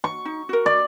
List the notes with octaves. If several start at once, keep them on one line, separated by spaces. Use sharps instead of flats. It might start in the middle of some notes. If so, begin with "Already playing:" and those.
C#6
D#4
F#4 A#4
D5